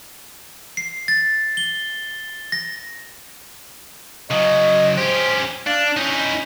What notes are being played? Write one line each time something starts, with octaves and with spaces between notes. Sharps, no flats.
C7
A6
G7
A#6
C#3 F#3 D#5
C#4 G4 C5
D4 F5
C#4 D#4 E4